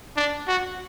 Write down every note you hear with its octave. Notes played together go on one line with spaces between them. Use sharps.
D4
F#4